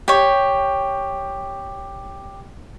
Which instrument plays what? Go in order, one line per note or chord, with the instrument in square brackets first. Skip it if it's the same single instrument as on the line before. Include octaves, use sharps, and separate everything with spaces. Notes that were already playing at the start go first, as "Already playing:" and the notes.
[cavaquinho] G4 C#5